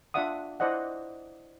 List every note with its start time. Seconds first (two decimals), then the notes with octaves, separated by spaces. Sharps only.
0.14 D4 F4 D5 E5 F#5 D#6
0.60 E4 C5 D5 D#5 F#5